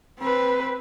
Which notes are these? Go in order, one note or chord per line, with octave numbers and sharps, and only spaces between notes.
C4 B4